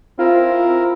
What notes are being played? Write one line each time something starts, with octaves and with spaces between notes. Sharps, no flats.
C4 E4 F4 A#4